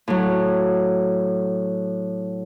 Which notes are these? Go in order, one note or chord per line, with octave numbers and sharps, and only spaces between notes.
A2 F#3